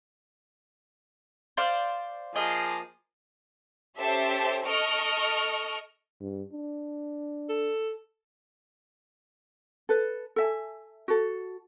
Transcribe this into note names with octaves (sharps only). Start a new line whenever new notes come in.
C5 D5 F5
F3 A#3 G#4 D#5
C#4 G4 A4 C5 E5 A5
A4 D#5 C#6 F6 D7
G2
D4
A4
A4 B4
A4 E5 G#5
F#4 A4